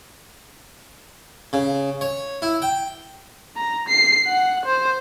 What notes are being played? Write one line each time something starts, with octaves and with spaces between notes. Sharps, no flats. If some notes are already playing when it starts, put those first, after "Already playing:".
C#3
C#5
E4
G5
A#5
C7
F#5
C5